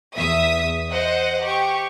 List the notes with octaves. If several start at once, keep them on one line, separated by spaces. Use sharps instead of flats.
E2 E5 D#6 B6
C5 D#5 F#5
G4 C#6